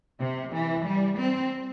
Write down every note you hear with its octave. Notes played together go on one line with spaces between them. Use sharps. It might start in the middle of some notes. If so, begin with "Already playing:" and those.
C3
E3
G3
C4